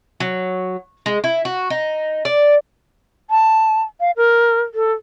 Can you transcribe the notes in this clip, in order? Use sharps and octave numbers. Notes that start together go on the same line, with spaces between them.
F#3
G#3
E4
F#4
D#4
D5
A5
F5
A#4
A4